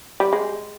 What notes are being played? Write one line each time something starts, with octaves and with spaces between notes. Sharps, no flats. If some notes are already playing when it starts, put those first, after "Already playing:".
G3
G#3